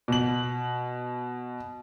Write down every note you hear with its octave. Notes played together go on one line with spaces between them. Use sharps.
B2 F#7